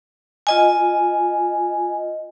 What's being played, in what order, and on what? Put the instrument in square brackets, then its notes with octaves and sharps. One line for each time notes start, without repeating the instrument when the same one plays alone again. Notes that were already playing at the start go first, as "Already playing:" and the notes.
[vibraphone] F4 D#5 G#5